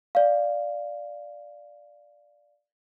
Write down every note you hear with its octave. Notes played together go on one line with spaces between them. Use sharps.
D5 F5